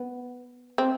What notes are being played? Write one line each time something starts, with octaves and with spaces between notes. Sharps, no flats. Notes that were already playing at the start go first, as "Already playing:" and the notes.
Already playing: B3
C4